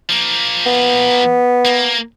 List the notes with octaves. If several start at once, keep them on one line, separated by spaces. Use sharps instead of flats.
F3 A#3
B3
A#3